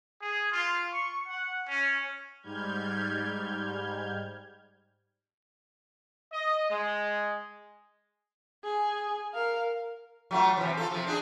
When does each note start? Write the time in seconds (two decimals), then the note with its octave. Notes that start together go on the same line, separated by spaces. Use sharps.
0.21 G#4
0.51 F4
0.92 C#6
1.27 F#5
1.67 C#4
2.42 G#2 G3 F6 G6 G#6
6.32 D#5
6.70 G#3
8.64 G#4
9.34 A#4 F5
10.31 F#3 A3 F4
10.57 C3 E3
10.77 F4 A4
10.91 C3 F3
11.07 D4 G#4